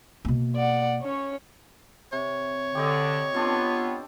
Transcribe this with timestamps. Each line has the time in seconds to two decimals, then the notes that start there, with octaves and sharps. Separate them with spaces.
0.25 B2 A#3
0.56 D5 F#5
1.02 C#4 C#5
2.12 C3 C#5
2.75 D3 G4 D5 D#5
3.34 B3 C4 D4 F4 A4